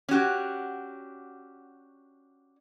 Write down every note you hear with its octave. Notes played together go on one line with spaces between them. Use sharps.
C#4 D4 F#4 G4